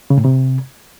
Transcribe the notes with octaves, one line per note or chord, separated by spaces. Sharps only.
C#3
A2
C3